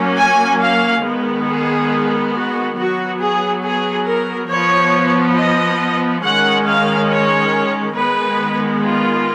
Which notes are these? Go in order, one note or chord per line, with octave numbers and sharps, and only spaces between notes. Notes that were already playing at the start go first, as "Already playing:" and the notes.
Already playing: F#3 A#3 C#4
G#5
F5
D#3 G#3 B3
G#4
F#4
F#3 B3 F#4
G#4
G#4
A#4
F3 B3 C#5
D#5
D#3 G#3 C#4 F#5
F5
C#5
D#3 G#3 B3 B4
F4